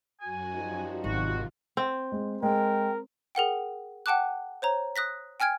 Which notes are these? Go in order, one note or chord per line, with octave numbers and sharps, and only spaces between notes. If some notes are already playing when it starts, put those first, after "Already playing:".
F#2 F#4 G#5
F3 G3 D#4
G#1 C3 D#3 F4 F#4
C4
G#3
G#3 A#4 G5
G#4 A#4 F#5 G5
F#5 G5 A5 D6 F#6
C5 C#5 A#5
D#6 F#6 A#6 B6
G5 G#5 F6 G#6 D7